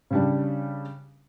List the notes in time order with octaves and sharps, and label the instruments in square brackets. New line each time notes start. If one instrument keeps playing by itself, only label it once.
[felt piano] C#3 G3 D4